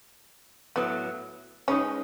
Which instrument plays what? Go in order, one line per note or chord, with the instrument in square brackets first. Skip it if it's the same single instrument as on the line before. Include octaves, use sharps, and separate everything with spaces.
[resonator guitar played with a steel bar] A2 F#3 A3 [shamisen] B3
[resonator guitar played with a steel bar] G#3 D#4 G#4 B4 [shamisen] C#4